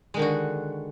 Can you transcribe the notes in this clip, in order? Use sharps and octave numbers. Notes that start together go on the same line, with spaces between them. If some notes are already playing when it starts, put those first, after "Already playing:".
D3 D#3 G#3 F#4